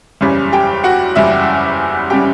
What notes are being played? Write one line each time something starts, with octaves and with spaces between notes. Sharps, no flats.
F#1 E2 C#3 G3 C#4
G4 G5
F#4 F#5
F#1 E2 C#3 G3 C#4 E4 E5
C#3 G3 C#4 G4 G5